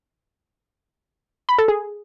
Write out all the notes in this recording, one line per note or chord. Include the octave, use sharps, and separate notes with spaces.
B5
A4
G#4